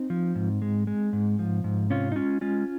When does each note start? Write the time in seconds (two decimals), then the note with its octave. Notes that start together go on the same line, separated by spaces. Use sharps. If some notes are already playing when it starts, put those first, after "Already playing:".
Already playing: C4 D#4
0.10 F3
0.35 G#2
0.62 G#3
0.87 G#3
1.13 G#2
1.39 F3
1.64 G#2
1.90 C3 C#4 F4
2.12 D#4
2.16 G#3 C#4 F4
2.41 G#3 C#4 F4